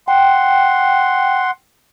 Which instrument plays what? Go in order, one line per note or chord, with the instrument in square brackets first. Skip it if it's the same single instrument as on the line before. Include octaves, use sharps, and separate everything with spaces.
[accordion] F#5 C6 [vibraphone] G5